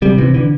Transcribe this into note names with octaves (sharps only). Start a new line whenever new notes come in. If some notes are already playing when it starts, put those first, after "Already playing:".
C3 G3
C3 E3
D3 E3